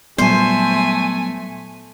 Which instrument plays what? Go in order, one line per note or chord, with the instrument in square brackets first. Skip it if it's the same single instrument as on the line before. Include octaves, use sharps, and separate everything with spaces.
[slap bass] A#2 G3 [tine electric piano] F#3 B3 [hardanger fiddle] A3 G#5 [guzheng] C5